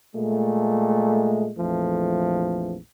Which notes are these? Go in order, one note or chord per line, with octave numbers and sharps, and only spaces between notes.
A#2 G#3 A3
A#1 F2 E3 F3 A3